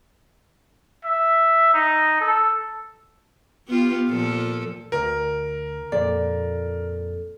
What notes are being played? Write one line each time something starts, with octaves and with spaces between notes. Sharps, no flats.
E5
D#4
A4
B3 F4 G4
A#2 F3 A4
D2 A#4
F2 A#2 A4 D5